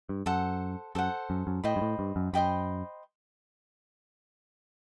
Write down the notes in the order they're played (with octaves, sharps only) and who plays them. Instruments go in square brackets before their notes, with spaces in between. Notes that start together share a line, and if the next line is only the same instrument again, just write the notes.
[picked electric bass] G2
[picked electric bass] F#2 [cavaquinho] A4 C5 F#5
[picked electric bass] F#2 [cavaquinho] A4 C5 F#5
[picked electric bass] F#2
F#2
[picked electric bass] A2 [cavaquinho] C5 D#5 G5 B5
[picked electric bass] G2
A2
G2
F#2
[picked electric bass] F#2 [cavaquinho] C5 D#5 G5 B5